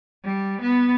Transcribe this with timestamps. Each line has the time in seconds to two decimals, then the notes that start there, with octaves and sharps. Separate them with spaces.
0.25 G3
0.61 B3